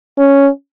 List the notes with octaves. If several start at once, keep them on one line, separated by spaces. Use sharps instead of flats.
C#4